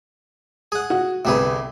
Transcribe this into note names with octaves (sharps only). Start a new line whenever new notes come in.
G#4 F#5
F#4
G1 C2 C3 G4 G#4 B4